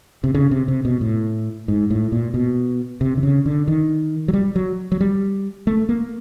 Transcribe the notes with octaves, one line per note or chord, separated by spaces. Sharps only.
C3
C#3
C3
C3
B2
A2
G#2
A2
A#2
B2
C3
D3
C#3
D3
D#3
F#3
G3
F#3
F#3
G3
A3
A#3